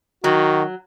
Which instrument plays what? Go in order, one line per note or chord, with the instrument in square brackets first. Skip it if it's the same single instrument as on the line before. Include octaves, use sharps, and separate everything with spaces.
[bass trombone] D#3 [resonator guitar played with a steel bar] F#3 [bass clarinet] F#4